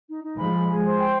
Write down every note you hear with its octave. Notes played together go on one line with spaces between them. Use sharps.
D#4
D#4
F3 G#3 B5
G#4
G#4
C5
G5